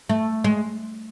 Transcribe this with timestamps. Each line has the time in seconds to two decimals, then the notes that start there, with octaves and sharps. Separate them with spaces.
0.09 A3
0.44 G#3